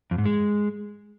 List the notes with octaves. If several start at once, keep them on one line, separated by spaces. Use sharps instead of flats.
F2
G#2
G#3